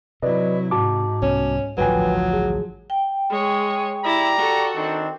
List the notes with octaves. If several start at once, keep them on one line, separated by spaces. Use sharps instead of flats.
C3 F#3 E4 B4 D5 D#5
G#2 F#4 A5 D6
C2 G3 B3 C#4
A1 D2 G2 F3 F#3 B4 G5 G#5
G#4
G5
G#3 C#5
E4 G4 D5 A#5
F#4 A4
D#3 C4 D4